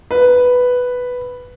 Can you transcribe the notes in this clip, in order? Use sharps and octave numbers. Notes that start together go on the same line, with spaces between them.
B4